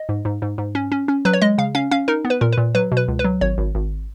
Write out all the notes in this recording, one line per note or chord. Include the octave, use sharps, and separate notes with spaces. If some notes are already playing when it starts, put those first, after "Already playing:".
Already playing: D#5
G#2
G#2
G#2
G#2
C#4
C#4
C#4
F#3 B4
C#5
G#3 D#5
C#3 F5
C#4 F5
C#4 F5
D#4 A#4
B3
B4
A#2 A#4
B4
A#2
F#3 B4
B2
B4
C#2
B4
F#3
G#1 C#5
G#1
G#1